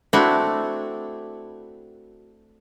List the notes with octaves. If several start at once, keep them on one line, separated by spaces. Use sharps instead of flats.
A3 C4 D4 E4 F#4